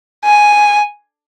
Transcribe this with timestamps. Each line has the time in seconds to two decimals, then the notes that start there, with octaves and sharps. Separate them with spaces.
0.25 G#5